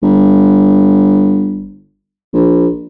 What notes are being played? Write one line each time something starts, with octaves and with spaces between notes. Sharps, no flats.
G1
A#1